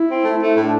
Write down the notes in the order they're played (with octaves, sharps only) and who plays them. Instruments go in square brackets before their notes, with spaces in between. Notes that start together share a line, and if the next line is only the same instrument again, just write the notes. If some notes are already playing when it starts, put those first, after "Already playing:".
Already playing: [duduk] E4
[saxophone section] C4
A3
A3
[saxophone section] A2 [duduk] D4